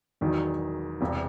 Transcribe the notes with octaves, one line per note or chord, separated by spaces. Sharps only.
E1 E2 D#3 F#3
E1 E2 C3